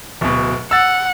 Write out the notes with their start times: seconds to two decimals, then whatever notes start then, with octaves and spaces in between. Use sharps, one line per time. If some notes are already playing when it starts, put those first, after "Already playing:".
0.21 D1 B2
0.71 F#5 E6 A6